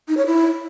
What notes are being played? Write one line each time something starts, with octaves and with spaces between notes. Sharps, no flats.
D#4
C#5
E4